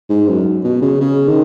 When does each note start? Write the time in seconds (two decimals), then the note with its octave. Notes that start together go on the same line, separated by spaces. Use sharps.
0.09 G#2
0.27 F#2
0.64 B2
0.82 C#3
1.00 C#3
1.28 D#3